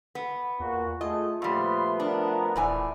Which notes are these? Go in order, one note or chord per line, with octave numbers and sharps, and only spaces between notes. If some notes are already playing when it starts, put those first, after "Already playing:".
B3
E2 A#2 F#4
A3 F4 G#4 D#5
A#2 F3 G3 A3 B3 C6
D4 A#4
D#1 E2 A2 D5 G#5